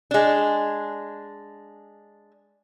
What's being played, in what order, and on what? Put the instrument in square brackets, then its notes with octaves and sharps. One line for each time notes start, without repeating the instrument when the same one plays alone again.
[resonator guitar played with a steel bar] G#3 D4